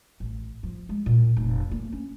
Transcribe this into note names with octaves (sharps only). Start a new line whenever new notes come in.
A1
F3
G#3
A#2
F1
A#3
C#4